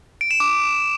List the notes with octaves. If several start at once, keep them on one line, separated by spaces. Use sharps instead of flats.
D7
E7
D6